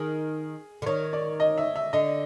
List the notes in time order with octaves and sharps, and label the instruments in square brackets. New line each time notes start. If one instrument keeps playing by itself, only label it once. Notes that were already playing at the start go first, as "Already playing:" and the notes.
Already playing: [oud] D#3 [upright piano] G#4
[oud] D3
[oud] D#3 [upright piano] C#5
[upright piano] D5
D#5
E5
E5
[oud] D3 [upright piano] D#5